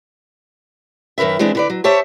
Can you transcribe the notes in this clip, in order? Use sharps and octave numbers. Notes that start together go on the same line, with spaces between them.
F#2 D#3 A#4 B4 E5
E3 G#3 C4 D4 B4
D3 B4 D5
F#3
G4 C5 C#5 E5 A5